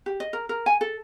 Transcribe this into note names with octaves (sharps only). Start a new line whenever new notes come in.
G4
D#5
A#4
A#4
G#5
A4